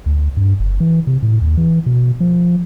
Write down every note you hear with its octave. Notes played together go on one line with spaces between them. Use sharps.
D2
G2
F#1
E3
C3
A2
D#2
E3
B2
F3